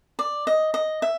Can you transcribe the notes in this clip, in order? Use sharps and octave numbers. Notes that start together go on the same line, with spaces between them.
D5
D#5
D#5
E5